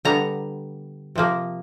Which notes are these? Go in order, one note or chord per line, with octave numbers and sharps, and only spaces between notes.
D3 G3 B3 A#5
C3 F3 A#3